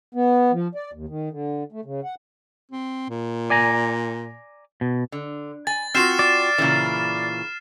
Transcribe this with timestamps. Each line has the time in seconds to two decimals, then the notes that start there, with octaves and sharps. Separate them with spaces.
0.15 B3
0.52 F3
0.75 D5
0.93 D#2
1.09 D#3
1.31 D3
1.72 A3
1.85 C#3
2.04 F#5
2.71 C4
3.10 A#2
3.50 D5 G#5 A#5
4.81 B2
5.12 D3
5.67 G#5 A6
5.95 C4 F4 F#4 F6 C7 E7
6.19 D5
6.58 A#2 C#3 E3